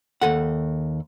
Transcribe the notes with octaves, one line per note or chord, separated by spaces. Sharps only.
D#2 A4 F#5